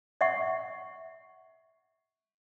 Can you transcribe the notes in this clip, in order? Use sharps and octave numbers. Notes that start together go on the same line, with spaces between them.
D#5 E5 F#5 C#6